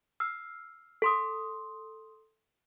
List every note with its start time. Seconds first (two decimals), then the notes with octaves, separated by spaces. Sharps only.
0.20 E6 F6 C7
1.02 A4 C6 D#6